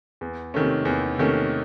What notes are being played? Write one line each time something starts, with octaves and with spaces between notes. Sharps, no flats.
E2
C3 D#3 A3 C#4
E2
C3 D#3 A3 C#4